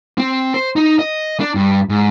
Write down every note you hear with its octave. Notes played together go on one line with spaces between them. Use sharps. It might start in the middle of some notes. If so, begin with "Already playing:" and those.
C4
C5
D#4
D#5
D4
G2
G#2